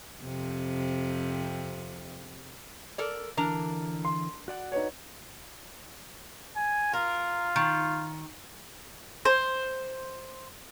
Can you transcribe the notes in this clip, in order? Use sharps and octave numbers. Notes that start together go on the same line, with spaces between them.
F2 C3
A4 A#4 D5
D3 E3 D4 A#4 A#5
C6
F#4 D5 F#5
D#4 B4 C#5
G#5
F4 A#4
D#3
C5